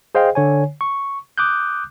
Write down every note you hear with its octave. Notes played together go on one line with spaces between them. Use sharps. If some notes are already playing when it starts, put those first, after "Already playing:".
G#4 C5 D#5 F5 G5
D3 C#5 G#5
C#6
D6 D#6 F#6 G6